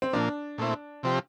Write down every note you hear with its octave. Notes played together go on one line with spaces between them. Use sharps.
C4
A#2 F3 A#3 D4
A#2 A3 C4 E4
C3 F3 C4 G4